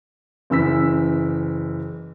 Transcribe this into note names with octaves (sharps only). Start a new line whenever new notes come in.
F#1 E3 E6 B6